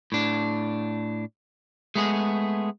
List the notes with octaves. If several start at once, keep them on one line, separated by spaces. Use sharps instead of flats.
A2 D4
G#3 A3 B3 G#4